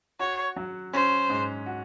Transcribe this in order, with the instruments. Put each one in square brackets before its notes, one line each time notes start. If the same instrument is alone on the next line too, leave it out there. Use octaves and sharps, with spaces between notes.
[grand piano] F#4 [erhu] C#5
[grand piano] F#3
[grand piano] C#4 [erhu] C5
[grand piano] G#2
F#4